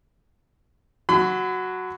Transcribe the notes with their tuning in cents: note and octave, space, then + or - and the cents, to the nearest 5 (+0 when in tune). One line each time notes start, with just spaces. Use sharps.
F#3 +0 B5 +35